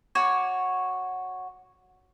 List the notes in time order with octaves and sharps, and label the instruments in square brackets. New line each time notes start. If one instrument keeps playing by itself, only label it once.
[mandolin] F#4 C#5 D5 G#5